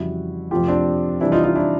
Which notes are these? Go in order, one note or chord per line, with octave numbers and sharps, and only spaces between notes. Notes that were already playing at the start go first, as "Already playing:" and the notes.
Already playing: F2 C#3 E3 G3 E4 F#4
F2 C3 F3 A3 F4 G4
C4 D4
C3 E3 G3 D4 E4
D#4 F4
D#4 F4
D4 E4